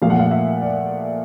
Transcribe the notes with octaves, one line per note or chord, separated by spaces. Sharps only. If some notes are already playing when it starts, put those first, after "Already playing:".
A#2 F3 A3 F5
F#5
F5
E5
D5